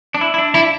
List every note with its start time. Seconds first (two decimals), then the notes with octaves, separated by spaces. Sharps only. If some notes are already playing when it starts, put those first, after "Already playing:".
0.15 D4
0.21 E4
0.34 E4
0.38 D4
0.55 E4